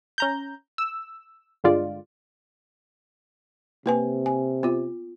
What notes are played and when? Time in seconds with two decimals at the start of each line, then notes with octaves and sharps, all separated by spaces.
0.18 C#4 A#5 G6
0.78 E6
1.64 G1 D3 G#3 F4 D5
3.86 C3 A#3 B4 G#5
4.26 G#5
4.63 B3 F4